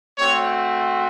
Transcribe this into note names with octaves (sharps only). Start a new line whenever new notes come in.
A3 C4 F#4 C#5